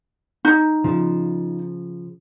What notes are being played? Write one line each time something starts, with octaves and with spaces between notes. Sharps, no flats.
D#4
C#3 F3